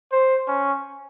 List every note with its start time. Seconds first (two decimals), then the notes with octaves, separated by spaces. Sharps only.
0.12 C5
0.48 C#4